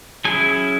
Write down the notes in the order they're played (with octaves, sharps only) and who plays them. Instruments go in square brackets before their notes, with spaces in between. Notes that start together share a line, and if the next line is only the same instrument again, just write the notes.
[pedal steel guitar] F#3 C#4 E4 G#4 G#5